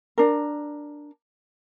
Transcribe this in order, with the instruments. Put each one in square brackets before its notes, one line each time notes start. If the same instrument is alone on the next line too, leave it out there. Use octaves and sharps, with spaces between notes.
[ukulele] D4 A#4